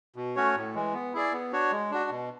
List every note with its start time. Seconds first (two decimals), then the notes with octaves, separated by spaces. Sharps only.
0.16 B2
0.36 A3 C#4 F#4 C#5
0.55 A2
0.75 E3 G#3
0.94 B3
1.14 E4 G#4 D5
1.33 B3
1.52 D4 F#4 C#5
1.72 G#3
1.91 D4 F#4
2.10 B2